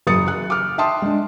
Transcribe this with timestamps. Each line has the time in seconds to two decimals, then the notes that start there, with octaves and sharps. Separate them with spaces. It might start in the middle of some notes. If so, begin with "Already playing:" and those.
0.07 F#1 F#3 D#6 A6 C#7
0.28 F#6
0.50 D6 F6
0.78 E5 G5 A5 C6 D#6
1.02 G#3 D4